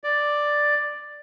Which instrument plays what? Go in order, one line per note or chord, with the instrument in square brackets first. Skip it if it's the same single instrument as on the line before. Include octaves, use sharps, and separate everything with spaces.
[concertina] D5